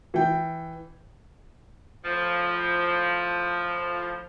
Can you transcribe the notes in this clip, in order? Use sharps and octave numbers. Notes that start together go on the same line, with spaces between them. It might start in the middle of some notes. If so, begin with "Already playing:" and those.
E3 G5
A2 F3